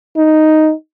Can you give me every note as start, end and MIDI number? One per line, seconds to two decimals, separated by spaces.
0.17 0.73 63